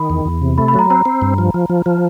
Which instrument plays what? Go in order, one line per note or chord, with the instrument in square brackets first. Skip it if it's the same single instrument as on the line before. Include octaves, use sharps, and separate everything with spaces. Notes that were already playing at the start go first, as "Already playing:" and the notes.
Already playing: [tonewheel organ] D#3 [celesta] B5
[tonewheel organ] E2
E2
C3
[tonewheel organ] A3 [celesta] B5
[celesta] B5
[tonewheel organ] F#3 [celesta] A#5
[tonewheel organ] C4 [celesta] A#5
[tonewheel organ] C4
G2
F3
F3
F3
F3